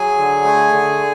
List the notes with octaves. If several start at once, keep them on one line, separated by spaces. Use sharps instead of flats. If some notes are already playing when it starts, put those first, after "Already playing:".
Already playing: F#3 G#4 G#5
D3
A3
D3